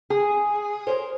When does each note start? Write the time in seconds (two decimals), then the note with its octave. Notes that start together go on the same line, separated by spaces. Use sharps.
0.10 G#4
0.87 A#4 C5 C#5